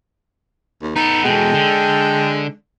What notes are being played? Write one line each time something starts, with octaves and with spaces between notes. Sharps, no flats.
D#2
B3 D#4 A4
E2 B2 G#3 A4 G5
D3